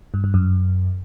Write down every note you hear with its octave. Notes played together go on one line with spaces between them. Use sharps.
G2
G2
F#2